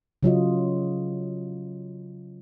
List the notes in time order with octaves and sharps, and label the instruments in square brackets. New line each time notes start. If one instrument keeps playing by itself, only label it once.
[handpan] C#3 F#3 F4 D#5